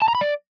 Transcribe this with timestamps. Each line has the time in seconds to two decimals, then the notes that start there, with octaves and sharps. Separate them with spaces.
0.02 A5
0.08 A#5
0.15 B5
0.21 D5